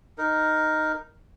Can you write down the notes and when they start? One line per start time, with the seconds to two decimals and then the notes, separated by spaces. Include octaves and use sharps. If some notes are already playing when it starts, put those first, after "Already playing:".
0.18 D#4 A#4